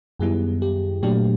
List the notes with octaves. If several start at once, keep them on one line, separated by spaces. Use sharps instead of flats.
F#2 D#3 G3 B3 E4 G#4
G4
A#2 F#3 A3 D4 G4